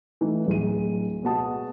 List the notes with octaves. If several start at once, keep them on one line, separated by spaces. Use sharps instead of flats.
E3 A3 D#4
D1 G#4 D#7
B2 G#3 B3 F#4 A5 D#6